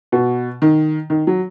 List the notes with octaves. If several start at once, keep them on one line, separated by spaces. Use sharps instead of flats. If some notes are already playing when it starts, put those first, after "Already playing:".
B2
D#3
D#3
F#3